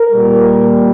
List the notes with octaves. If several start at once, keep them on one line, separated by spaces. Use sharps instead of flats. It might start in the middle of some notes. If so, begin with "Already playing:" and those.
Already playing: A#4
A#2 G3